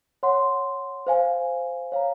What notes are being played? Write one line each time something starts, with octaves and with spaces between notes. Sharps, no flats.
C#5 F#5 C6
C5 F5 G#5
C#5 F5 A#5